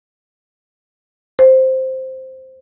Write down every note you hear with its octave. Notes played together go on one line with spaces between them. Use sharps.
C5